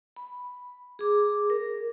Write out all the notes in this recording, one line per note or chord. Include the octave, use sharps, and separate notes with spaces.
B5
G#4 D6
A#4